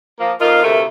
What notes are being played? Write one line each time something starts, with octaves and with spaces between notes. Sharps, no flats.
F3 A#3
F2 D#4 F4 A#4
D2 C3 A3